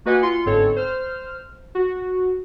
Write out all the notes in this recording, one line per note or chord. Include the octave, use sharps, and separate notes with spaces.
A#3 F#4 B4 D#5 F#5 G#5
F4 C6 C#7
G1 G#2 C4 A4 C#5
C5 F6
F#4